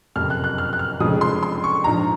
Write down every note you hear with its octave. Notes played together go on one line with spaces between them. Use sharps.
F#1 F2 C3 F3 F6
F#6
F#6
F6
F#6
F6
F1 F2 C#3 F3 G#3 D#6
C6
C6
C#6
A#1 G#2 F3 A#5